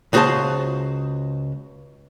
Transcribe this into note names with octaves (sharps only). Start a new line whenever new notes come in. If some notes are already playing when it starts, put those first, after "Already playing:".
C#2 F#4 G#4 C5 F5 A5